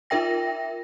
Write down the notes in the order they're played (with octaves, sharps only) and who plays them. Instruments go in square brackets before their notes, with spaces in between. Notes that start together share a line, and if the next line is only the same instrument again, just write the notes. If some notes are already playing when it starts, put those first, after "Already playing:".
[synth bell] D#4 F4 A#4 E5 G5 A#6